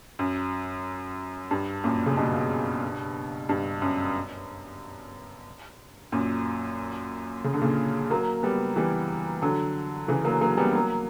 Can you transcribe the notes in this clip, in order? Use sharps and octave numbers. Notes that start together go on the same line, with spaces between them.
F#2
G2
F#2 A#2
C#3
G2 B2
G2
F#2
F#2 A#2
C#3
D3
A#2 C#3
F#3 A#3
G3 B3
E3 G3
D3 F#3
C#3 E3
F#3 A#3
F#3 A#3
G3 B3
F#3 A#3